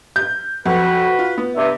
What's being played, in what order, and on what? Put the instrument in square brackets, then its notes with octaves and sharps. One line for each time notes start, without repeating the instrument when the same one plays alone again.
[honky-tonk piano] G6
[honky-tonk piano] F2 [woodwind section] F#4 B4
[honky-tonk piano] F4
B3
[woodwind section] G2 C3 E5